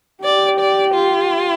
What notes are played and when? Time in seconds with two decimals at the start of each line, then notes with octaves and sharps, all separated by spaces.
0.24 G4 D5
0.59 D5
0.94 F4